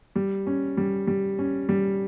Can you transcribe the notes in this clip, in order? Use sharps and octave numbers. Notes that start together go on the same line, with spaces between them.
G3
C#4
G3
G3
C#4
G3